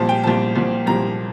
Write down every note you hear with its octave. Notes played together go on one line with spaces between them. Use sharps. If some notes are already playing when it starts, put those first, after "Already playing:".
Already playing: C2 A#2 F3 A5
G5
C2 A#2 F3 A5
C2 A#2 F3
C2 A#2 F3 A#5